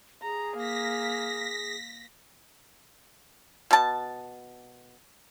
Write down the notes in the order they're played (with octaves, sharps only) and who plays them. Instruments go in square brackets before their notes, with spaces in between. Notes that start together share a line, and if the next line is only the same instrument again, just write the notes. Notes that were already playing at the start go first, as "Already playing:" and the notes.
[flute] G#4 [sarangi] A#5
[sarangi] A#3 [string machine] A#6 B6
[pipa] B2 A5